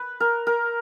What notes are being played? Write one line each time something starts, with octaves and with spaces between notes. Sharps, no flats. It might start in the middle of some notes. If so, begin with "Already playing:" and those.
Already playing: B4
A#4
A#4